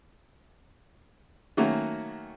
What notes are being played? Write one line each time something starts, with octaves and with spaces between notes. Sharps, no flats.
D#3 F#3 A3 A#3 C#4 F#4